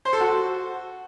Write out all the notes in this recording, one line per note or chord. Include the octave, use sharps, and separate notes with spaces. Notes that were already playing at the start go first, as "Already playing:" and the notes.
C5
A4
F#4